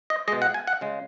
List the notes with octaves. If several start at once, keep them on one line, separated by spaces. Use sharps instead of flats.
D#5
B2 G#3 D#5
F#5
G#5
F#5
C#3 G#3